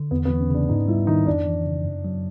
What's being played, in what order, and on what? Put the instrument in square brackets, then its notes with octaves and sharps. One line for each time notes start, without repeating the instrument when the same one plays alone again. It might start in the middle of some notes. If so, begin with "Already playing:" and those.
Already playing: [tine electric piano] D3
[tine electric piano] E2 [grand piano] B3
[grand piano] B3
[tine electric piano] E3
[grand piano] C#4
[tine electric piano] C#3 [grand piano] D4
[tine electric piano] G#2 [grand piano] D#4
[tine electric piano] G3 [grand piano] E4
[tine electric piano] D#3 [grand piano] D#4
[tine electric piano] F2 [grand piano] D4
[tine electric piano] E3
C#3
F#2
F#3